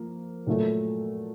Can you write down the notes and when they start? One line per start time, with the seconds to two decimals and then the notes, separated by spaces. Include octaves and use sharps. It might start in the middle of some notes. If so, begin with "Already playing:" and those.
Already playing: F3 A#3
0.47 A#2 F#3 A3